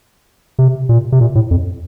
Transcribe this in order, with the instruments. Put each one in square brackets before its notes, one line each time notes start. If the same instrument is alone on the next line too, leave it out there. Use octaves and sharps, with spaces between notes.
[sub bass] C3
A#2
C3
A#2
A2
F2